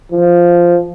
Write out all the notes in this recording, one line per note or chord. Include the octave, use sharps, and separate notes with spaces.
F3